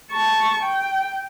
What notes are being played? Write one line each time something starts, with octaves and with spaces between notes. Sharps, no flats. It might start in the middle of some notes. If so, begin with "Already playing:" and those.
A5 C#6
G5